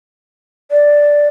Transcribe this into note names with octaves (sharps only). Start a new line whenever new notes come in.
D5